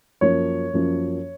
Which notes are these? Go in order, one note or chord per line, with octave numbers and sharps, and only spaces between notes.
F#2 F3 A#3 C#5
F#2 F3 A#3